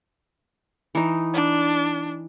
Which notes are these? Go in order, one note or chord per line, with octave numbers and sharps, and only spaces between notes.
E3 D#4
D4